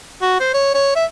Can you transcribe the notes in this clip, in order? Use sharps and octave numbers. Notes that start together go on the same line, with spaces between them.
F#4
C5
C#5
C#5
E5